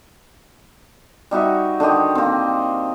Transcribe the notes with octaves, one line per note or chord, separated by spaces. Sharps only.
G3 D#4 F#4 E5
D3 D#3 G4 D#5
A#3 C4